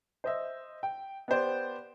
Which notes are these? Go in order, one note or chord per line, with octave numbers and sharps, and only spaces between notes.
C5 D#5 E5
G5
B3 G4 C5 D5